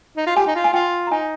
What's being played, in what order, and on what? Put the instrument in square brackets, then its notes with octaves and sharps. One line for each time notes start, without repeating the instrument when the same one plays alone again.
[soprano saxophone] D#4
F4
[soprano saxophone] G4 [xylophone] G#5
[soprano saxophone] D#4
F4
[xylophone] G#5
[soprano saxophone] F4 [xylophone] G5
[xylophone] A#5
[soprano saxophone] D#4 [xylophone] G#5